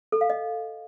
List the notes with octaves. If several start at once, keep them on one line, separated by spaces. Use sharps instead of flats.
A4
F5
D#5